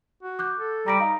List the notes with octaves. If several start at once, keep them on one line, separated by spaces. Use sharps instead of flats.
F#4
D6 F#6 G6
A4
G3 A#5 A#6 D7
D#4 F5